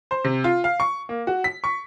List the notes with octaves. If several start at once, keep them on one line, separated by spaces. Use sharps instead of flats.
C5
C3
F4
F5
C#6
A#3
F#4
B6
C#6